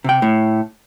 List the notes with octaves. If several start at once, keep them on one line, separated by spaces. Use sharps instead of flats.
C3 G5
A2